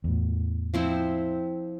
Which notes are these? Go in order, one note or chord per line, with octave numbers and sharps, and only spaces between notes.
E2 A2
F3 C4 E4